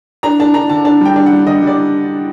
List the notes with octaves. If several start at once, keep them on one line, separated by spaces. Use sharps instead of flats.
D4 A#5
D4 A5
D4 A#5
D3 A5
D4 A5
G3 G5
D4
F#5
G3
D3 D#5
G3 D5